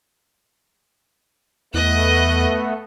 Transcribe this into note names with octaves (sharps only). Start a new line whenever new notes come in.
E2 A3 B3 D#5 F#6